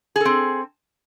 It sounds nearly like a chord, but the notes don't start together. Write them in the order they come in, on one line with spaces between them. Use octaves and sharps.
G#4 A4 C4